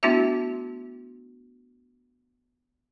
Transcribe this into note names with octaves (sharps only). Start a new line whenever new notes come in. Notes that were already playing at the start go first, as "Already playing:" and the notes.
A3 B3 D4 E4 F#4 E5